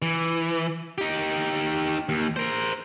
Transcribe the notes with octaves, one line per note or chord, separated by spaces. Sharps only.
E3
D#4 G4
D#2
A#4 C5